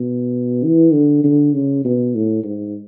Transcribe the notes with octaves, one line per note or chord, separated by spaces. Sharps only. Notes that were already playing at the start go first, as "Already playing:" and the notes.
Already playing: B2
E3
D3
D3
C#3
B2
A2
G#2